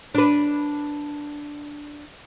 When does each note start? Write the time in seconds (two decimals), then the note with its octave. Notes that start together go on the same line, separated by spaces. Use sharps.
0.15 D4 B4